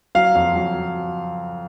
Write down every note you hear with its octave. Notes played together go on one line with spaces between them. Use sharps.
F#3 F5
F2
F#3